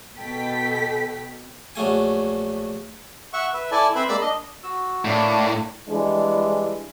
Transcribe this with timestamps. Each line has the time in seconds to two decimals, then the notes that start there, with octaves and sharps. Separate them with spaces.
0.17 B2 A4 G5 B6
1.75 A#1 F#3 A3 G#5
3.33 E5 F#5 C#6
3.54 B4 E5
3.72 E4 A4 D5 G#5 A5
3.95 C4 B4 C5 E5 B5
4.09 G#3 A#3 D5 B5 D6 E6
4.21 D4 D#5
4.63 F#4 E6
5.05 A2 A3 A#3 D4
5.89 E3 G3 G#3 D4 E4